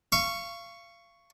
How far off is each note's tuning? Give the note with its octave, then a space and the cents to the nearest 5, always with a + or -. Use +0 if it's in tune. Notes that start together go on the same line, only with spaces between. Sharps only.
F5 -30 C#6 +0